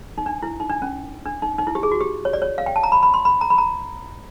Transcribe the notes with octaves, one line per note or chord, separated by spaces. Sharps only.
D#4
D4
E4
D#4
D4
C#4
D4
D#4
D#4
E4
G4
G#4
F#4
G4
C#5
D5
C#5
F5
G5
A5
A#5
B5
B5
C6
B5
A#5
B5
A#5